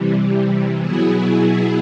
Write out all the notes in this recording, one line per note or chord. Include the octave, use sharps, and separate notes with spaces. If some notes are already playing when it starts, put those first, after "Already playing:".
Already playing: C3 E3 G3
B2 F#3 B3 E4 G#4